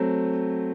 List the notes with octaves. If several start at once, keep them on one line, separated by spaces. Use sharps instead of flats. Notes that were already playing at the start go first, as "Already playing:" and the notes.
Already playing: F#3 A3 C4